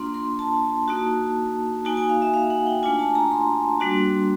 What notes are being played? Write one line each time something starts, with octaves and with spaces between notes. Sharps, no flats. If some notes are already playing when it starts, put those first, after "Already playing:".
Already playing: A#3 D4 F4 C6
C6
A5
A#3 D#4 F#4
A#3 D#4 F#4 G#5
G#5
F5
E5
F5
F#5
G5
A3 D4 F4 G#5
A5
A#5
C6
G3 A#3 D4 F#4